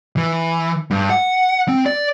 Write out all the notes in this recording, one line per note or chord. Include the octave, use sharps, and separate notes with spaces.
E3
G2
F#5
C4
D5